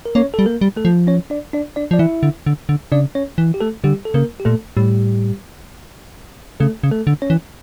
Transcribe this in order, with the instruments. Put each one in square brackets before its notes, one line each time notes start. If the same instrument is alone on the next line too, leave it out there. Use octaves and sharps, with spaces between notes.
[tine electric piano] A#4
[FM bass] A#3 [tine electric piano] C#4 C#5
[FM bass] G3 [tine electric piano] A4
[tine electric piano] A#3 A#4
[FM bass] G3
[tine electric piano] A3 A4
[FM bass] F3
[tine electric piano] C#4 C#5
D4 D5
D4 D5
D4 D5
[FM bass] F3 [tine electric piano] D5
[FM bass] E3 [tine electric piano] E4 E5
[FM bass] D3
D3
D3
[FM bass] C#3 [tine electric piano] D4 D5
[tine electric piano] C#4 C#5
[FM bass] E3
[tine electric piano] G4
A3 A4
[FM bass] D3 [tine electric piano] G3 G4
[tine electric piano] A4
[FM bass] C#3 [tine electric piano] A#3 A#4
[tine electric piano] G4
[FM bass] A#2 [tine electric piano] A3 A4
[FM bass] A2 [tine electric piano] G3 G4
[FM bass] C#3 [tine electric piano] A3 A4
[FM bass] C#3
[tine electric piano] A3 A4
[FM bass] D3
[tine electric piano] C#4 C#5
[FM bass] E3